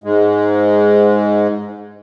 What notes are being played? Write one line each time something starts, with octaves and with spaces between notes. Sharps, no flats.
G#2 G#3